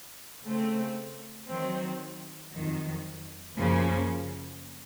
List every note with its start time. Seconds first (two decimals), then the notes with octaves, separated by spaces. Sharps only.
0.44 C#3 A3 C4
1.48 D#3 F#3 C4
2.53 F2 D#3 F#3
3.56 F#2 C#3 F3 A#3 C#4